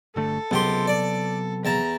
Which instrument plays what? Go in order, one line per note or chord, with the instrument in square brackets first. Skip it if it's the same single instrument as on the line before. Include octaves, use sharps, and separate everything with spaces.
[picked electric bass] G1 D3 A3 [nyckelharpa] A4
[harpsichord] C#2 G4 C6 [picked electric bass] C3 F#3 B3
[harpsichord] D5
[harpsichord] E2 A5 [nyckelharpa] A#5